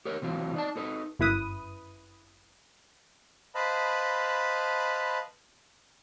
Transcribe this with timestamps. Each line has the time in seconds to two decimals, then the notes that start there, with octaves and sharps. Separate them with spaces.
0.05 G4 A#4 C#5
0.22 C3 E3 F#3 F4
0.54 D#4 D5 A5
0.76 D#4 A4 B4
1.19 G1 F#2 E4 B4 D#6
3.55 B4 C5 D#5 F5 A5 B5